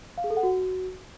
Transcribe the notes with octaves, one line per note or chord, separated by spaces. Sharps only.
F5
G#4
A4
F#5
F#4